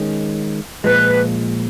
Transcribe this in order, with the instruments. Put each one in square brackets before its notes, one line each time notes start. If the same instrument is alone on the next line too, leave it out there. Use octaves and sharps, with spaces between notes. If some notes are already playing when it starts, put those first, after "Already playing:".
Already playing: [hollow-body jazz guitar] D#3 G#3 C#4
[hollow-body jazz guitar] A#2 F3 G#3 [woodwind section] B4